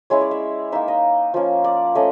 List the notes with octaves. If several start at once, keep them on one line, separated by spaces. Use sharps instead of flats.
G#3 C#4 E4 C#5
D5
E5
A#3 D#4 E5
D#5
F3 A#3 C#4
D5
A3 C#4 D#5